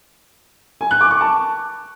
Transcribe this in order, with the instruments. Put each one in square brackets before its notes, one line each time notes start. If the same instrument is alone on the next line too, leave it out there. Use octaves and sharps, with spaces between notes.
[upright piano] G#5
F#6
D6
C#6
A5